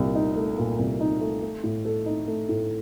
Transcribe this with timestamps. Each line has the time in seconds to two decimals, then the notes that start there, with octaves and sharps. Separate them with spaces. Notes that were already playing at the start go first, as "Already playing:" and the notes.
Already playing: C2 A#2
0.15 D#4
0.36 A3
0.58 A#2
0.79 C2
1.00 D#4
1.21 A3
1.42 A3
1.64 A2
1.85 A4
2.06 D#4
2.28 A3
2.49 A2